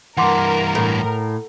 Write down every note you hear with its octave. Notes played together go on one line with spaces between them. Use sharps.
G2 E3 A#4 F#5 C6 D6
A2